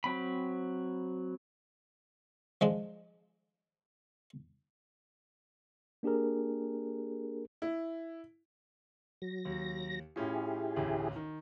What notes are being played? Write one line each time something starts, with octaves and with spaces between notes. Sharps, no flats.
F#3 C4 B5
F3 G#3 D4
A#3 D4 G4 G#4 A#4
E4
F#3 A#6
D#2
A2 C#4 E4 F4 G4 G#4
A1 D2
D#3